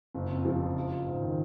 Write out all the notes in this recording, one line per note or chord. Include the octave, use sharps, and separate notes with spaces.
F#1
F2
F3
F#1
F4
F4
G#2
D#3